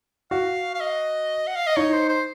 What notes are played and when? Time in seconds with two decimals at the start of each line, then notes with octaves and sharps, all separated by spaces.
0.31 F#4 F5
0.75 F5
0.80 D#5
1.47 F#5
1.56 F5
1.67 D#5
1.77 D#4 C#5
1.93 C5
2.08 C5